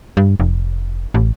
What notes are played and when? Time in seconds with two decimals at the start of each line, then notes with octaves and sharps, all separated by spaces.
0.17 G2
0.40 F1
1.14 A1